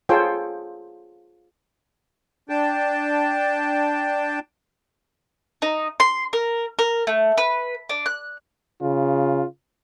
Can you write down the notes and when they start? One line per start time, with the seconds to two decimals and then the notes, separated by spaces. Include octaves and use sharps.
0.09 F4 G#4 A4 C5 C#5 G5
2.49 D4 G5 A5
5.62 D#4
6.00 C6
6.33 A#4
6.79 A#4
7.07 A3
7.38 B4
7.89 D4
8.06 F#6
8.82 C#3 F4